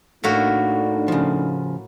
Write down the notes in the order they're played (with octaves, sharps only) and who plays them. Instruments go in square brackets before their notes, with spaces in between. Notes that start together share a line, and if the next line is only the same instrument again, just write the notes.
[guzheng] A2 A#3 F#4 [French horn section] A3 D4 D#4
[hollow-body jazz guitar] C#3 F3